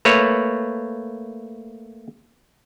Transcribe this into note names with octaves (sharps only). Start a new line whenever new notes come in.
A3 A#3 B4 C#5